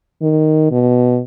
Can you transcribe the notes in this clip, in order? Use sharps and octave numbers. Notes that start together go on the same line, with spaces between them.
D#3
B2